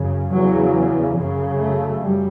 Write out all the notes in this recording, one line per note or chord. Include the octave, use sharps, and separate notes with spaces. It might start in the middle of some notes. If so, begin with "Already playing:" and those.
Already playing: F#2 C#3
E2 C#3 F#3
F#2 C#3
A3
F#2 G3